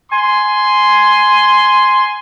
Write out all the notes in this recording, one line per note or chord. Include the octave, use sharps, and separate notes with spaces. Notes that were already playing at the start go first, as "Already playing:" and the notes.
G#5 C6